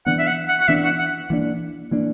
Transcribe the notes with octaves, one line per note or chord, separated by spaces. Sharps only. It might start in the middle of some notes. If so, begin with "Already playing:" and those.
E3 B3 D4 F#5
E5
F#5
F#5
F#5
E3 B3 D4 E5
F#5
F#5
E3 A#3 D4
E3 A#3 D4